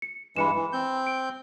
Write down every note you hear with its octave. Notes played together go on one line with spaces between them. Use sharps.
C#7
G2 E3 G#3 B5 C#7 E7
E3
C4 G6
D7